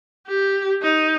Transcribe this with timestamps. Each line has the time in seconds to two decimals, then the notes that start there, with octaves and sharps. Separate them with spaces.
0.28 G4
0.82 D#4